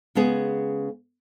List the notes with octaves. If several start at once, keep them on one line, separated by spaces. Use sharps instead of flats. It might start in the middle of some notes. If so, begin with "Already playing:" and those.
C#3 G#3 B3 G#4